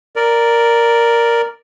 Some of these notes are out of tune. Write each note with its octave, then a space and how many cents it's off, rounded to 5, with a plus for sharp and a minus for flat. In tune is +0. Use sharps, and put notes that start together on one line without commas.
A#4 +0 D5 +0